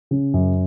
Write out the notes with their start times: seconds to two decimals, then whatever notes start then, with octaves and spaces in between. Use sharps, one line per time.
0.11 C#3
0.34 F#2